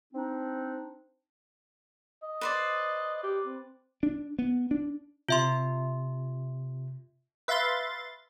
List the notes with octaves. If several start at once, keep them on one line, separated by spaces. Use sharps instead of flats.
C4 D4 D#4
D#5
B4 C5 D5
G4
C4
D4
B3
D4
C3 F4 E5 C6
B4 E5 F5 C6 A6